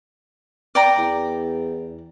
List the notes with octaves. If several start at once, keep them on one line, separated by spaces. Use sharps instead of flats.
D5 G5 A#5
E2